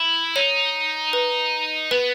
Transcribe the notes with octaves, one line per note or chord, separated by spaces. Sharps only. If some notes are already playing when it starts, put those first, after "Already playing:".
Already playing: E4
D#4 C#5
B4
B3 B4